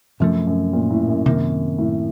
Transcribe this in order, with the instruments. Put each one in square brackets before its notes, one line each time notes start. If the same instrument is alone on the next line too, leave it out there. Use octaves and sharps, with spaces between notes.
[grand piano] F#2 [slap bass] C3 F3 A3
[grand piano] F#2
A#2
A2
F#2
[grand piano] F#2 [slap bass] C3 D#3 A#3
[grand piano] A2